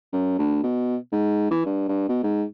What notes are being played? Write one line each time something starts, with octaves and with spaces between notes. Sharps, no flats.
F#2
D2
B2
G#2
E3
G2
G2
B2
G#2